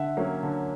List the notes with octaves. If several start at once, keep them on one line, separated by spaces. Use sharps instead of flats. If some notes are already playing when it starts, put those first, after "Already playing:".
Already playing: D3 E5 F#5
F#3 A#3 C#4
D3